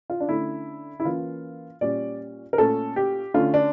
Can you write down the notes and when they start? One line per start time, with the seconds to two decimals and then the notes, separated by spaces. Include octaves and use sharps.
0.10 F4
0.20 D4
0.29 D3 A3 C#4 E4
1.00 E4
1.05 E3 A#3 C#4 F4
1.81 A#2 G3 C#4 D5
2.53 A#4
2.58 A#2 A3 C#4 A4
2.96 G4
3.34 D3 A3 C#4 F4
3.54 D4